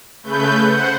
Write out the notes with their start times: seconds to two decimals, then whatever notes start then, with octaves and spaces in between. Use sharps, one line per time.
0.23 C#3 A3 B4 G6
0.67 C5 F#5